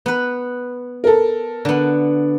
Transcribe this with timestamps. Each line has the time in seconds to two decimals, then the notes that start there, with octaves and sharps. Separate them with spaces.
0.06 B3 B4
1.04 A4 A#4
1.65 D3 B3